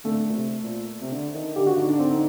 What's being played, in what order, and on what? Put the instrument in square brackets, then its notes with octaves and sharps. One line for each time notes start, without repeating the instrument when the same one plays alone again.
[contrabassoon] D3 [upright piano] A3
[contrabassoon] A#2
C3
A#2
C3
D3
D#3
[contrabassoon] D3 [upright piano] G4
[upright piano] F#4
[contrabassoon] D3 [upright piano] D#4
[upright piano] D4
C4
D#4